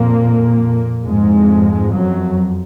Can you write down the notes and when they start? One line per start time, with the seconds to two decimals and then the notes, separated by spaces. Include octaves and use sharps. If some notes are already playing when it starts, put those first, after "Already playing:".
Already playing: F2 A#2 A#3
1.03 F2 G#2 G#3
1.92 F#2 F#3